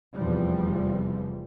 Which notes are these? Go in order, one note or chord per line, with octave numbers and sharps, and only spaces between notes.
F1 E2 E3 F3 G3